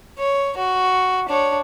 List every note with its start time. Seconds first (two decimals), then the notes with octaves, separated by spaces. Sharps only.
0.19 C#5
0.57 F#4
1.28 D4 C#5